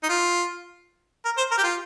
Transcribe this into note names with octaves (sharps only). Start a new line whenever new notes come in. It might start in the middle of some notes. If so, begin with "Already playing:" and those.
D#4
F4
A#4
C5
A#4
G4
F4